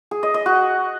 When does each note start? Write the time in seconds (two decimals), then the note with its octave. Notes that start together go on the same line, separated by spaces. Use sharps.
0.11 G#4
0.23 D#5
0.34 D#5
0.46 F#4